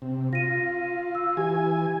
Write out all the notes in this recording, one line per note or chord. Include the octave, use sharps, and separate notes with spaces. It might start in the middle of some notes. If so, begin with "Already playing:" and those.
C3
F4 A#6 D#7
E6
E3 G4 G#5